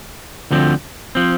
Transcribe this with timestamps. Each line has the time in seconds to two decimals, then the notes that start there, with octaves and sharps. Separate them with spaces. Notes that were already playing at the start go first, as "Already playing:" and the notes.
0.51 D2 D3 F3 C4
1.15 F3 C4